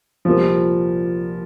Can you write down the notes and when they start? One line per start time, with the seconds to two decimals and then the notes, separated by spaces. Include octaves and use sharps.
0.25 C2 A#2 F3 G3 A#3